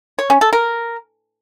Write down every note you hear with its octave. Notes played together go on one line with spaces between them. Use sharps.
C#5
C#4
A4
A#4